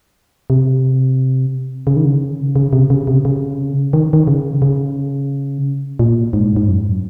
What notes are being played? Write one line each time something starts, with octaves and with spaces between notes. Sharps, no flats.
C3
C#3
D#3
C#3
C#3
C3
C#3
C3
C#3
D#3
D#3
C#3
C#3
A#2
G#2
G#2
F#2